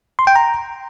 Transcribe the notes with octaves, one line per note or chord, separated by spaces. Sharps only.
C6
G5
A#5